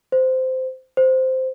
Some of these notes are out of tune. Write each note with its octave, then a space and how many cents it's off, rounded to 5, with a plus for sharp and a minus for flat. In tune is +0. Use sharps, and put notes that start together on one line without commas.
C5 -15
C5 -10